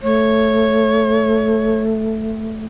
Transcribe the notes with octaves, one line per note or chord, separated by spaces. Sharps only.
A3 C#5